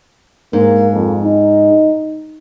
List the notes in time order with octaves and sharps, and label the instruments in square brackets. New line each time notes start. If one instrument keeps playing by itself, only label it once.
[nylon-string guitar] G#2 [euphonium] A#3
[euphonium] F2
D#4